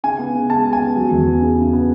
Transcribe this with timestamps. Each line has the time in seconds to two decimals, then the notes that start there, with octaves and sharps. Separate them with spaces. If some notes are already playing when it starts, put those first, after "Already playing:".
0.04 C#3 G#5
0.19 B3
0.34 C#3
0.50 G#3 A5
0.65 C#3
0.73 G#5
0.80 B3
0.96 F#3
1.11 E2
1.26 B3
1.42 C#3
1.57 C#3
1.73 B3